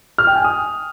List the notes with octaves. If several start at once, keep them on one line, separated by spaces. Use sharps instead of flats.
F6
G5
G#5
D#6